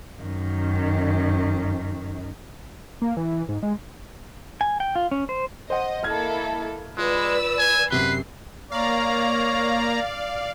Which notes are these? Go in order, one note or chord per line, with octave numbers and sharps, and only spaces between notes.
F#2 D#3
A#3
E3
G#2
G#3
G#5
G5
F4
C#4
C5
C5 D#5 F#5
A#3 E4 A4 D#5 F6 G#6
G#3 F4 B4 D5 E6
G#5
F#2 C3 B4 C7 G7
A#3 C#5 D5 F5 A#5